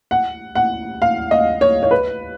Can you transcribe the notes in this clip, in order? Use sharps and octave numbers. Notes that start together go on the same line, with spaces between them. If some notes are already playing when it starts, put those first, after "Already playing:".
F#5
F#5
F5
D#5
C#5
C#5
B4